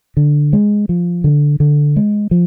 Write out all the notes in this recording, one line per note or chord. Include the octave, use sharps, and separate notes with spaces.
D3
G#3
F3
D3
D3
G#3
F3